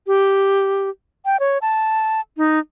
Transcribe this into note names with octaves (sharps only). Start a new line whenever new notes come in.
G4
G5
C#5
A5
D#4